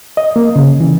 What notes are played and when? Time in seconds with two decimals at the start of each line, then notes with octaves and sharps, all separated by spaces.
0.17 D#5
0.36 A#3
0.56 C#3
0.80 E3